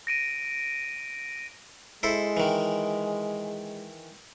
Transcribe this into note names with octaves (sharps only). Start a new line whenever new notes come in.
A#6 D7 D#7
G#3 E4 A4 C5
D#3 E3